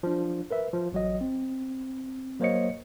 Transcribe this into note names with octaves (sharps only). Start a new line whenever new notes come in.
F3 D4
A#4 B4 E5
F3
A1 F#3 D#5
C4
F#3 A#3 C5 C#5 D#5 C#7